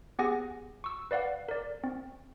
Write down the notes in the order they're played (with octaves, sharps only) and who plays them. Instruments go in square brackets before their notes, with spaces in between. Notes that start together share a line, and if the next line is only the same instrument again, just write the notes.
[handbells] B3 G4 G#4 F#5 G#5 A#6
C#6 E6
B4 D5 F5 F#5
A#4 D5
C4